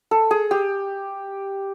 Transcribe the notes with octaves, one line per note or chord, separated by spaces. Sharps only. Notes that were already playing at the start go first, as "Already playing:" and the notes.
A4
G#4
G4